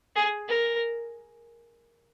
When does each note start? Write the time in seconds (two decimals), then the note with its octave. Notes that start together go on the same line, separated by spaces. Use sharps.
0.16 G#4
0.48 A#4